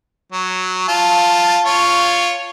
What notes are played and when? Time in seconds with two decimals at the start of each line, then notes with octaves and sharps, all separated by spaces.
0.32 F#3
0.88 F4 A5
1.66 F4 C#5